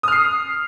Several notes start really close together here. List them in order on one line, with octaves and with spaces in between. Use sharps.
D#6 F6 C7